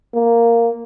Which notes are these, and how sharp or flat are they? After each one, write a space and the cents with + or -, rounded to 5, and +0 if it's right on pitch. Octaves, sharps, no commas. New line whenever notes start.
A#3 -5